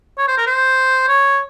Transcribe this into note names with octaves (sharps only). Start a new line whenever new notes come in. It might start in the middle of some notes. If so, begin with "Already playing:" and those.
C#5
C5
A#4
C5
C#5